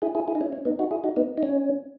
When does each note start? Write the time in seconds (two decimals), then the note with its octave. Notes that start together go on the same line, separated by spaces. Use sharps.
0.02 E4 G#4
0.15 E4 G#4
0.28 E4 G#4
0.35 D#4
0.41 C#4 E4
0.52 C#4
0.65 B3 D#4
0.79 D#4 F#4
0.91 E4 G#4
1.04 D#4 F#4
1.16 B3 D#4
1.37 D#4
1.43 C#4